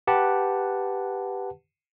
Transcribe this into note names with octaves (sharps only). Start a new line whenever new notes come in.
G4 B4 F#5 A5